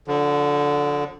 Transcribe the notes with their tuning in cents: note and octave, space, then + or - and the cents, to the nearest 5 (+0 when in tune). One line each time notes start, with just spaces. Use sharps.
D3 -10 F3 +40